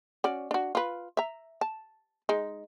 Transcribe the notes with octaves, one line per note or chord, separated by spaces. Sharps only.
C#4 F#4 D5
D4 F#4
F4 B4
E5 A#5
A5
G#3 D#4